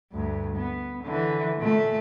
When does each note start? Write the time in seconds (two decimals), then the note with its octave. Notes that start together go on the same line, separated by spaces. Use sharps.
0.12 D2 G2
0.56 B3
1.03 D3 E3
1.58 A#2 A3